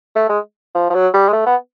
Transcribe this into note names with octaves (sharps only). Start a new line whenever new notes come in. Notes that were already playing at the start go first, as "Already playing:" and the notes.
A3
G#3
F3
F3
F#3
G3
G#3
A3
B3